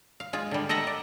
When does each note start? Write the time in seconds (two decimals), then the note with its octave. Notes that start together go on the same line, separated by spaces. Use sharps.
0.20 F5
0.33 G#3 F4
0.51 D3 G3
0.69 A4 D#5 E5 F#5 A#5
0.87 D5